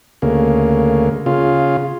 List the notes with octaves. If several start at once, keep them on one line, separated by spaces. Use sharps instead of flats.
D2 C#3 A#3
C#3 F4